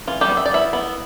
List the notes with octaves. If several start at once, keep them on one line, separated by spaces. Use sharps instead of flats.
E3 F4
G3 G4
B3
E5
D5
B3 E4 E5
B3